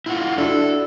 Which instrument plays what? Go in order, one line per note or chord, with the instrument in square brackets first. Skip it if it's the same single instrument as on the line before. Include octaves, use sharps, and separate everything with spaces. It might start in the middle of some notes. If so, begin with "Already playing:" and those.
[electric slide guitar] E4 F4 F#5
[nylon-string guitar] D4 E4 F#4 [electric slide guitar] A4